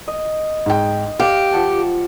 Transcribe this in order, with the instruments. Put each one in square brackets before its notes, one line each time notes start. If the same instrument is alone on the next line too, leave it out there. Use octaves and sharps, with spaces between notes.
[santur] D#5
[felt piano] G#2 G5
[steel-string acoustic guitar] G4 [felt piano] F5
[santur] F3 F#5 A5